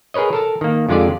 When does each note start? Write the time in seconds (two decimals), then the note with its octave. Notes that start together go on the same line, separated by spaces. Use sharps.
0.14 G#4 A#4 B4 C#5 D#5
0.33 A4 A#4 A5
0.61 D#3 A#3
0.89 F2 D3 G#3 F4 G4 D5